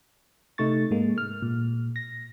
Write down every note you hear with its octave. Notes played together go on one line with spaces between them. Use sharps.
C3 A3 D#4 C#6 A6
G#2 G#3 A#3
F6
A#2
A#6